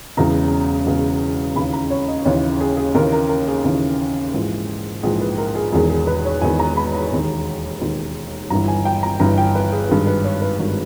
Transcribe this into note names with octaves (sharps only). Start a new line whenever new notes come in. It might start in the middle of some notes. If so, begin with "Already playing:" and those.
E1 E2 C#3 E3 A#5
E1 E2 C#3 E3
D#2 C#3 E3 B5
A#5
C#5
D#5
D#2 C#3 E3 C#5
G#4
G#4
D#2 C#3 E3 A#4
A#4
A#4
G#4
D#2 C#3 E3
A#1 G#2 E3
A#1 G#2 E3 G#4
B4
A#4
G#4
E1 E2 D#3 G#4
G#4
B4
C#5
E1 E2 D#3 G#5
A#5
B5
A#5
E1 D#2 D#3
E1 D#2 D#3
G1 G2 E3 A#5
G#5
G5
A#5
G1 G2 E3 A#5
G5
B4
G#4
G#1 G2 D#3 G#4
B4
C#5
B4
G#1 G2 D#3 A#4